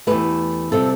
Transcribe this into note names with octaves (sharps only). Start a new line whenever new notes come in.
E2 B2 A3 G4 B4
C3 G3 F4 A4